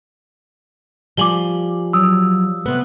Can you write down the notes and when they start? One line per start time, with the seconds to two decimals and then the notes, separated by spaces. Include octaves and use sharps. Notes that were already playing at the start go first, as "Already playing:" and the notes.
1.17 F3 G3 G#5 D6 F#7 G7
1.93 F#3 D#6 E6
2.66 C3 B3 F#6